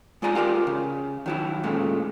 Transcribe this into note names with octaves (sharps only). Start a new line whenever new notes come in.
G#3 F4 D5 G#5 A#5
F4 G4 A#4 D5
C#3
D#3 F#3 E4
A#2 C#3 G#3 A3